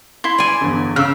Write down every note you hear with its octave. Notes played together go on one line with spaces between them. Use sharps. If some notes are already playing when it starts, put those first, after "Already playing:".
E4 C6
D5 G#5
G1 E2
C#3 E6 F6